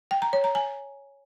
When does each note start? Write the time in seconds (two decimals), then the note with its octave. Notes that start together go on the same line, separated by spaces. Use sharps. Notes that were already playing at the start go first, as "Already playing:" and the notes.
0.11 G5
0.22 A#5
0.33 C#5
0.44 A#5
0.55 G#5